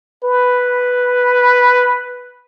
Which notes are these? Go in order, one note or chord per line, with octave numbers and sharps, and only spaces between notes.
B4